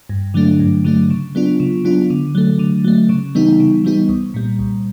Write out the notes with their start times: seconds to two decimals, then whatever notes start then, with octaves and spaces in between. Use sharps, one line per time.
0.09 G2
0.34 D3 F#3 A3 D4
0.60 G2
0.84 D3 F#3 A3 D4
1.10 C#3
1.35 F#3 B3 D4 F4
1.60 C#3
1.85 F#3 B3 D4 F4
2.10 D3
2.35 F#3 A3
2.59 D3
2.84 F#3 A3
3.09 C#3
3.35 E3 G3 B3 D#4
3.60 C#3
3.84 E3 G3 B3 D#4
4.09 C2
4.34 A#2 G3
4.59 C2